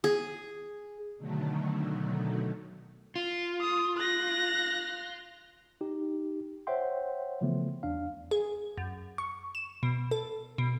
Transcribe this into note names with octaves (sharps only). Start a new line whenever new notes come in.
G#4
B2 D3 D#3 F#3 A3
F4
D#6
F#6 A#6
D#4 G4
C5 C#5 E5 F#5 G5 C6
C#3 E3 F3 A3 B3
E2 D4 F5
G#4
F#2
C#6
E7
B2
A4
B2